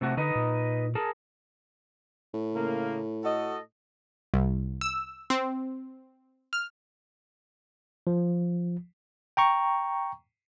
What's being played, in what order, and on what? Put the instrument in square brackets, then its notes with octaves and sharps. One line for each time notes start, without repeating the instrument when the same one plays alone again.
[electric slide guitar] C3 A3 F#4
[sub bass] D3 [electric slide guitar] D#4 B4 D#5
[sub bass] A#2
[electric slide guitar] G#4 A#4 A5
[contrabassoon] A2
[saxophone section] C#3 A#3
F#4 A4 D#5
[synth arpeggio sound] C2
E6
C4
F6
[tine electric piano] F3
G5 A#5 C#6